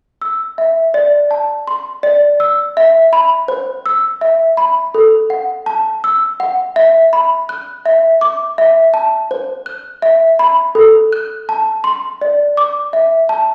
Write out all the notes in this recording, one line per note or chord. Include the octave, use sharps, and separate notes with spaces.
E6
E5
D5
A5
C6
D5
E6
E5
B5
C5
E6
E5
B5
A4
F#5
A5
E6
F#5
E5
B5
F#6
E5
D6
E5
A5
C5
F#6
E5
B5
A4
F#6
A5
C6
D5
D6
E5
A5